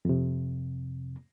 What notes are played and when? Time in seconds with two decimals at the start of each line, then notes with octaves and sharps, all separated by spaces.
0.05 F2 C3